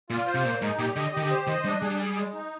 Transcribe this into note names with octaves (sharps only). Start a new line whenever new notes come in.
A#2 F4
C5
C3
A#2 A#3
G#2 D#4
A#2 G4
D3 D#5
D#3 G4
D3
C5
D#3 D#5
G3 D4
G3 G#4
G#4
G#3
D#4